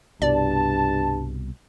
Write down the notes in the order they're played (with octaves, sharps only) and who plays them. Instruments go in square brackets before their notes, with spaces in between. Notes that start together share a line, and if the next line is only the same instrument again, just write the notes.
[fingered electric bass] C2 B2 [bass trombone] G2 [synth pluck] D5 [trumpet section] A5